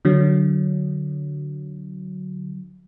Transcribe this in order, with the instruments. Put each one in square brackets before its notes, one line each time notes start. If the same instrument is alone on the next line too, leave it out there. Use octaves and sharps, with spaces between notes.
[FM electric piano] D3 F#3